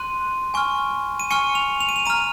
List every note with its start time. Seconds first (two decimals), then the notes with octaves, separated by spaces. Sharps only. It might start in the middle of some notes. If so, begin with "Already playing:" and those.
Already playing: C6 F#6 D#7
0.54 G#5 C#6 F6
1.20 D#7
1.31 G#5 C#6 F6 C#7
1.55 F7
1.80 F7
1.89 D#7
1.96 F7
2.06 A#5 F6 D#7